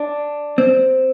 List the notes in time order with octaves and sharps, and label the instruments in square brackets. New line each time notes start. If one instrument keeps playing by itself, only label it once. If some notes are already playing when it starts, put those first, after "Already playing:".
Already playing: [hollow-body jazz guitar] D4
C4